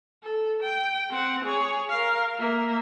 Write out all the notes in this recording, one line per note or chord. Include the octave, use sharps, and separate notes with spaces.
A4
G5
C4 F#5
G#4 C#5
A#4 F5
A#3 E5